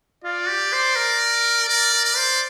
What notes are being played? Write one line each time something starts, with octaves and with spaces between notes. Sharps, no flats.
F4 D5
G4
C5
A#4
A#4 D5
A#4
D5
C5